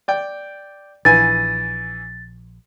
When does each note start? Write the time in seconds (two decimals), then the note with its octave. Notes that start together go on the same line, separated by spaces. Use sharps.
0.08 D5 G5
1.05 A#1 E3 G#5 A6